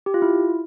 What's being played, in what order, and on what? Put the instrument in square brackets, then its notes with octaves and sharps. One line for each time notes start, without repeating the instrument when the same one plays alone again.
[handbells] G4
F4
E4